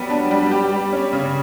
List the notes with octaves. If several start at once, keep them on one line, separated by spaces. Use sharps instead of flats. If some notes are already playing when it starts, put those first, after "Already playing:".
Already playing: F#3 G3 B3
D4
G3
G4
G3
C#4
C#3